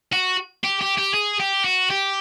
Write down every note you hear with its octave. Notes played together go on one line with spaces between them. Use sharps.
F#4
G4
G4
G4
G#4
G4
F#4
G4